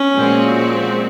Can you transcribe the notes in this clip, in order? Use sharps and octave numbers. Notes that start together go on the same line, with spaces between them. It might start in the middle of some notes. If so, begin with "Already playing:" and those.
Already playing: C#4
A#2 F3 G#3 C4 F#4